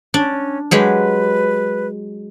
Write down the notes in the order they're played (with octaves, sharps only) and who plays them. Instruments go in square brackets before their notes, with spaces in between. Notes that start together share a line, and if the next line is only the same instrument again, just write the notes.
[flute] C#4 [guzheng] D4
[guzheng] F#3 G#3 G4 [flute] B4